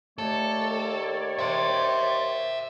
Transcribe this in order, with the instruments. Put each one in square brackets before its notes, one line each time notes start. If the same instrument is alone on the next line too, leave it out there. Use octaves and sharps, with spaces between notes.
[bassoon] D#2 [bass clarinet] A3 [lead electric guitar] A4 [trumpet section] C#5 D5
[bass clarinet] C5 [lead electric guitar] E5 G5